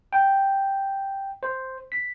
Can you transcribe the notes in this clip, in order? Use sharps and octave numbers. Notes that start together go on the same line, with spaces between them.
G5
C5
B6